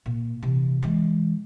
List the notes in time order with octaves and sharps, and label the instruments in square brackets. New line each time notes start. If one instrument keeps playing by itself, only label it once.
[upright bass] A#2
C3 E3
E3 G#3